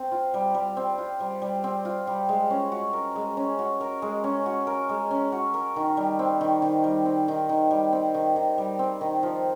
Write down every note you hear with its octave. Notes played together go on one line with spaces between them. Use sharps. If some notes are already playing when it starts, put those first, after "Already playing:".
Already playing: C4
F4
G3
G3
C4
F4
G3
G3
C4
F4
G3
G#3
C#4
F#4
A#4
G#3
C#4
F#4
A#4
G#3
C#4
F#4
A#4
G#3
C#4
F#4
A#4
D#3
G3
C4
D#3
D#3
G3
C4
D#3
D#3
G3
C4
D#3
D#3
G3
C4
D#3
F3